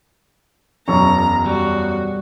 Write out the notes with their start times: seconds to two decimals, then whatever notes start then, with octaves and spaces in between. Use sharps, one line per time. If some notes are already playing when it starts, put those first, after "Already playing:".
0.88 E1 F#2 A#5 C#6
1.46 G3 F#4